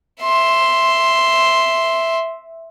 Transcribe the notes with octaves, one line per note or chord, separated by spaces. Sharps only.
E5 C6